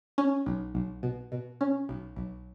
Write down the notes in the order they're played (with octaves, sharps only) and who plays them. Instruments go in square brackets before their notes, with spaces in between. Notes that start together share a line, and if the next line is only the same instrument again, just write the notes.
[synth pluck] C#4
B1
B1
B2
B2
C#4
B1
B1